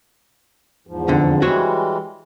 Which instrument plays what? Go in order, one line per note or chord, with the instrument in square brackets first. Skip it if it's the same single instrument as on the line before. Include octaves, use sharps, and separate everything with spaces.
[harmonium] E2 G#2 F3
[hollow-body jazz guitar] F2 D3
[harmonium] E3 G3 G#3 [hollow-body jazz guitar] F#4 C5 C#5